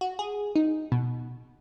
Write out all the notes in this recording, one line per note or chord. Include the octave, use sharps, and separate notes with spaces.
F#4
G#4
D#4
B2